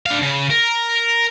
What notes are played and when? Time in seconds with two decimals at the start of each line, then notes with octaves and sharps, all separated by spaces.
0.06 D4 F5
0.22 C#3
0.51 A#4